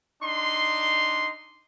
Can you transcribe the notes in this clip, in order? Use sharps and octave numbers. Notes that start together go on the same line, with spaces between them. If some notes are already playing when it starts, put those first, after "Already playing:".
D4 D#4 C6